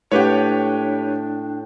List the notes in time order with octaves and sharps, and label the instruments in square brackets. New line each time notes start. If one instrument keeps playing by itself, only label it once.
[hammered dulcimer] A2 G5 [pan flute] D4 [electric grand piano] G4 B4 C#5